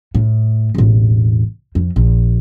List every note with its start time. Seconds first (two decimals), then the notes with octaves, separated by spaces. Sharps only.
0.15 A2
0.75 E1 A1
1.75 F2
1.96 A#1